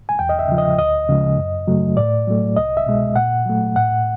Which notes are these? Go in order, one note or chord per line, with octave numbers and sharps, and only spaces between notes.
G#5
E2 G5
D#5
E5
C#3 F3
D#5
D2 D#5
C#3 F3 G#3
F#2
C#3 F#3 A3
A2 D5
F#3 A3
C2 D#5
E5
B2 G#3
A#2 F#5
F#3 A3
A2 F#5